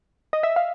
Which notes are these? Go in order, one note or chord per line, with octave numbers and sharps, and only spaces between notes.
D#5
E5
F5